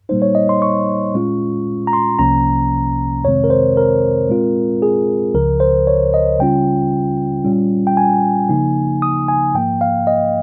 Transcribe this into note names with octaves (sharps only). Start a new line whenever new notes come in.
A#2 G3 A#3 D#4 C5
C#5
D#5
C6
C#6
A#2 G#3 C#4 F4
A#5
C6
C2 C3 F3 A#3 C#4 A#5
F2 C3 D#3 G#3 C4 C#5
A#4
C5
A#4
A#2 G#3 C4 F4
G#4
C#2 C#3 F3 A#4
C5
C#5
D#5
C#3 G3 C#4 F4 G5
A#2 G3 C#4 F4
G5
G#5
C#3 F3 A#3 D#4
D#6
G#5
G#2 F3 A#3 G5
F5
D#5